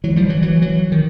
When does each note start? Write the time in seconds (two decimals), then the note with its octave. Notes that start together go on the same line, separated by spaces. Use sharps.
0.04 E3 F#3
0.16 F3 G3
0.29 E3 F#3
0.42 E3 F#3
0.62 E3 F#3
0.92 D#3